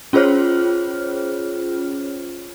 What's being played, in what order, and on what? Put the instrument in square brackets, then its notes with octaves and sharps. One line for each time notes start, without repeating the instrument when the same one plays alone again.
[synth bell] C#4 F4 G#4 C5 C#5 F6